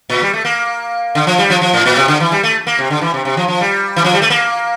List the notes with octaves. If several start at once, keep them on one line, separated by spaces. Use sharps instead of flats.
A#2
G3
A3
A#3
D3
F3
G3
F3
F3
A2
A#2
C3
D3
E3
G3
A3
A#3
C3
D3
E3
C3
C3
F3
F3
G3
E3
F3
G3
A3
A#3